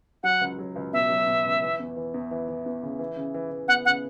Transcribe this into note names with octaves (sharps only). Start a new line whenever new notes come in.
F#3 F#5
C#2
F#3
C#2
B2 E5
F#3
B2
C#2
E3
E2
E3
E2
E3
E3
E2
C#3
E3
C#3
E3
E3
B3 F#5
C#3 F#5